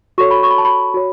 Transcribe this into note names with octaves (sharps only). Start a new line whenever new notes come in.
F#4 A4 C#5 C#6
B5
C#6
B5
A5
B5
F#4 C#5